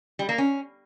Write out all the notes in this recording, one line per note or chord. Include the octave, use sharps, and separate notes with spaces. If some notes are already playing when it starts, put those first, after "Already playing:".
G3
A#3
C#4